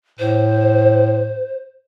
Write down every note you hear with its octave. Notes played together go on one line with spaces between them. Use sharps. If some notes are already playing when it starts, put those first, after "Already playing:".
A2 C5